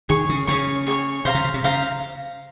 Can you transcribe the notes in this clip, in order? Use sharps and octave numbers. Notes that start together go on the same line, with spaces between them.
D#3 G#4 C#5 G#5 C#6
C#3
C#3 G#4 C#5 G#5 C#6
G#4 C#5 G#5 C#6
C3 C5 F5 A#5
C#3
C#3
C3
C#3 C5 F5 A#5